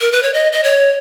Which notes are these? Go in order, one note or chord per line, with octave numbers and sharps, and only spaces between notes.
A#4
B4
C#5
D#5
D#5
C#5